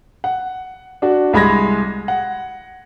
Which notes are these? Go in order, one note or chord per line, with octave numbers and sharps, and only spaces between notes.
F#5
D4 F#4
C2 G#3 B5 G#6 A#6
F#5